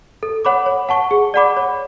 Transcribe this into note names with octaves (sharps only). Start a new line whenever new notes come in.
A4
C#5 F#5 B5 D6
C#5
F#5 A5 C#6
G#4
D5 F#5 B5 D6
C#5